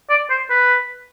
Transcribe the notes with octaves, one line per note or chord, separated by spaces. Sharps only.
D5
C5
B4